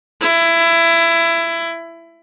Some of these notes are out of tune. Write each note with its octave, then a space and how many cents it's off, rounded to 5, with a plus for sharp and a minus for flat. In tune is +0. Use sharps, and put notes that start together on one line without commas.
E4 +20